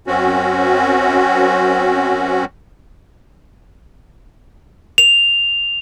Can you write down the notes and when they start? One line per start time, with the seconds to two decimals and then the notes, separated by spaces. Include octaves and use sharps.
0.07 F#2 C4 C#4 F#4
4.98 F7